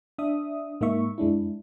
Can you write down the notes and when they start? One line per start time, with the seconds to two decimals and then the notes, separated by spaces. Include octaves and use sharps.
0.18 D4 E5 D#6
0.81 G#2 A#3 D#4 E5 C#6
1.18 F#2 G#3 D4 E4